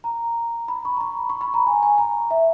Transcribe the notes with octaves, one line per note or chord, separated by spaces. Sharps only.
A#5
B5
C#6
A#5
B5
C#6
B5
A#5
G#5
G#5
A#5
E5